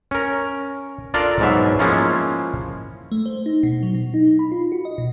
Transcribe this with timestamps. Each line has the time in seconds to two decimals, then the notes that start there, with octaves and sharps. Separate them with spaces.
0.11 C#4 A#4
1.14 D4 F4 A4 A#4 D5
1.40 G#2 B2 F#3 E5
1.79 F3 G#3 A#3 C#4 E4 F4
3.12 A3
3.26 C5
3.46 D#4
3.63 B2
3.83 F#3
3.94 B2
4.14 D#4
4.39 B5
4.52 F4
4.72 F#4
4.85 D#5
4.98 B2